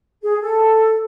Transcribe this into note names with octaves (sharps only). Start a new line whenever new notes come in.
G#4
A4